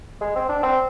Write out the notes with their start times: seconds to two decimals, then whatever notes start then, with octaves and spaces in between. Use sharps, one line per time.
0.21 G#3
0.36 C4
0.49 D4
0.63 C4